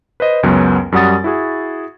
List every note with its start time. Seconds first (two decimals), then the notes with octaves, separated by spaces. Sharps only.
0.20 B4 C5 D#5
0.43 C#2 F#2 F#3 B3 C#4
0.92 F#2 G3 F#4 F#5 D#6 A6
1.24 E4 F#4 G#4